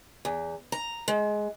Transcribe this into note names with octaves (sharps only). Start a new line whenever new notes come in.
E2
A#5
G#3